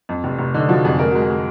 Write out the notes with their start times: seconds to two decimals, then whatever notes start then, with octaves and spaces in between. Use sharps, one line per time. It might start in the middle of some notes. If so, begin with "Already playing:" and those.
0.09 F2
0.24 F1
0.39 F1
0.54 D3 D#4
0.69 F3 F#4
0.84 F2 G#4
0.99 G#3 A#4
1.11 G#3 F#4
1.22 G#4
1.30 G#3